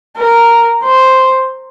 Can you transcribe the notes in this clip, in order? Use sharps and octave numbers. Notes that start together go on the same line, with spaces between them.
A#4
C5